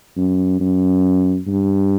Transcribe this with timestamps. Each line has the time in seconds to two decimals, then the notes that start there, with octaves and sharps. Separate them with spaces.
0.17 F#2
0.60 F#2
1.47 G2